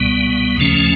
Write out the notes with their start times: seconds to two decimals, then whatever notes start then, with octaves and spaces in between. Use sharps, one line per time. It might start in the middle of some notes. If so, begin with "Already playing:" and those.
Already playing: C#2 B2 G3 B3
0.57 D#2 C#3 F3 A3 C#4